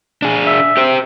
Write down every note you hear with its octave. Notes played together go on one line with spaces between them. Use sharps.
D4 G#4
E5
G4 C5